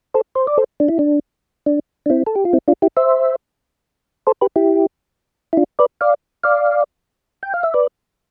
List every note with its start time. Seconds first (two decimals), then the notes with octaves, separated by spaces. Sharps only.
0.14 A4 C5
0.35 C5
0.47 D5
0.58 A4 C5
0.80 D4
0.88 E4
0.99 D4
1.66 D4
2.06 D4
2.10 C4 E4
2.27 A4
2.36 G4
2.45 F4
2.53 C4 E4
2.68 D4 F4
2.82 E4 G4
2.97 C5 E5
4.27 A4 C5
4.41 G4 B4
4.56 E4 G4
5.53 E4
5.57 D4 F4
5.79 B4 D5
6.01 D5 F5
6.44 D5 F5
7.43 G5
7.54 F5
7.63 E5
7.74 B4 D5